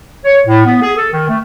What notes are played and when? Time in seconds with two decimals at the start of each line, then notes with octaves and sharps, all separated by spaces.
0.24 C#5
0.46 A2
0.66 B3
0.82 G#4
0.97 A4
1.12 D#3
1.29 A3